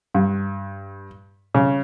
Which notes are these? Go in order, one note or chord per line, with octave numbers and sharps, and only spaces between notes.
G2
C#3